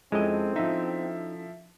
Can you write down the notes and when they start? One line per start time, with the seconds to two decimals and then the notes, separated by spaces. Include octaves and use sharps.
0.12 F2 G#3 C4 C#4 E4 A4 D#5
0.56 F3 D#4 E5